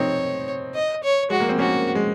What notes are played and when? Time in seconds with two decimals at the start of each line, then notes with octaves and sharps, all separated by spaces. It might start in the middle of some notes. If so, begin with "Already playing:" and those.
Already playing: F3 C4 D#4 C#5
0.75 D#5
1.03 C#5
1.30 G#3 F#4
1.40 A#3
1.49 C4
1.58 A#3 C#4 F#4
1.95 G#3